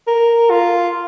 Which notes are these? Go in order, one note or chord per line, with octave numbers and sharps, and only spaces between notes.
A#4
F4